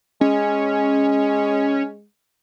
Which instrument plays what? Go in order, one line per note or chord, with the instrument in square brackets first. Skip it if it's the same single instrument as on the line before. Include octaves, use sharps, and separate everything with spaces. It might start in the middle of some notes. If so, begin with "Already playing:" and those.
[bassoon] G#3 [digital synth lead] C#4